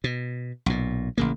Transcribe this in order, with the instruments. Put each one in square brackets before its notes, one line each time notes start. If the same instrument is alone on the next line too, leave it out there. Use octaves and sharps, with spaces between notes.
[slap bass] B2
B1 A#2
A1 C#3 A#3